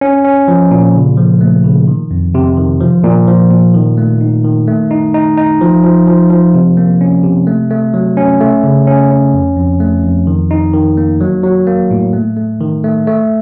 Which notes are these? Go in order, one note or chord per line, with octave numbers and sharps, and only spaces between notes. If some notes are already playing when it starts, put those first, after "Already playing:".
C#4
C#4
F3
A#2
C#3
F3
A3
C#3
D#3
F2
C3
D#3
F3
A#2
F3
A#2
D#3
A3
D#4
D#3
A3
D#4
D#4
D#4
F3
F3
F3
F3
C3
A#3
C#4
C3
A3
A3
F#3
C#4
A3
C#3
C#4
C#4
F2
F2
A3
F2
D#3
D#4
D#3
A#3
F#3
F#3
A#3
A2
A3
A3
D#3
A3
A3